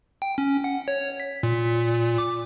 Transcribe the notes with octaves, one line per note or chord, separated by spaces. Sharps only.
G5
C#4
F#5
C#5
B6
A#2
D6